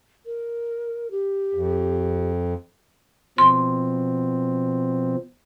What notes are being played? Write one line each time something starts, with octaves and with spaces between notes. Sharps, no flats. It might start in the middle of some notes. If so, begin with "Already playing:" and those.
A#4
G4
F2
B2 F3 C4 C6